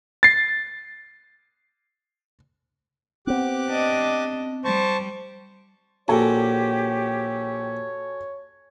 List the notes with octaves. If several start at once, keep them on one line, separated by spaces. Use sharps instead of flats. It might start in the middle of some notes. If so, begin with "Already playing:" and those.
A6 C7
B3 C4 G4 D6 F#6
D4 D#5
G3 C5 A5 C#6
A#1 A#2 F#4 G4 A4 C#5 G#5